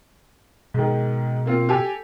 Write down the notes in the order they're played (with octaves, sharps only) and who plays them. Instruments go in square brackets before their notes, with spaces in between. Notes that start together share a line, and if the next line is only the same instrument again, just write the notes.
[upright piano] G#2 D#3 [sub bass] B2
[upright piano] A#3 C4 F4
G4 A4 G#5